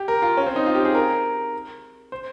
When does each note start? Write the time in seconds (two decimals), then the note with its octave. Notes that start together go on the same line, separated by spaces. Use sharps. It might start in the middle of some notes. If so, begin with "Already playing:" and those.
Already playing: G4
0.08 A#4
0.22 F4
0.37 C#4
0.46 C4
0.56 D#4
0.66 F4
0.75 G4
0.85 G#4
0.95 A#4
2.12 C5